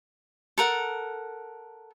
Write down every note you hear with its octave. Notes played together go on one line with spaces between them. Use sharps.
A4 A#4 F#5